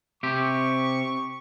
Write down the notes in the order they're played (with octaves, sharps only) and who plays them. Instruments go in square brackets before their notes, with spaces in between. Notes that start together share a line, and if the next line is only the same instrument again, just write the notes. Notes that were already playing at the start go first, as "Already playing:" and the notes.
[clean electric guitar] C3 C4 G4 [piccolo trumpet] C#6